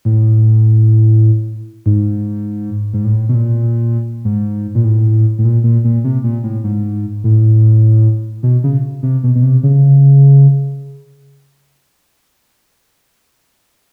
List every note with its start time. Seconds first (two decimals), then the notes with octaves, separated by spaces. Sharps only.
0.05 A2
1.86 G#2
2.94 G#2
3.05 A2
3.29 B2
3.34 A#2
4.25 G#2
4.75 A#2
4.84 A2
5.39 A2
5.44 A#2
5.64 A#2
5.84 A#2
6.04 C3
6.24 A#2
6.44 A2
6.64 G#2
7.24 A2
8.43 B2
8.64 C#3
9.03 C3
9.23 B2
9.35 B2
9.43 C3
9.63 C#3